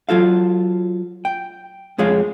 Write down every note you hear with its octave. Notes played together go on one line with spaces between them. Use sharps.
F#3 F4 A4 F5
G5
F2 G#3 G#4 C#5 F5